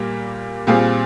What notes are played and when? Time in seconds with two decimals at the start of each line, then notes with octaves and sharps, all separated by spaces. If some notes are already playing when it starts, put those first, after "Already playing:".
Already playing: A#2 G3 A#3
0.67 A#2 G3 C4 F4 G#4